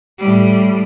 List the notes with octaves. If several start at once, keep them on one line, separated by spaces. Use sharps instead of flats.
A2 G3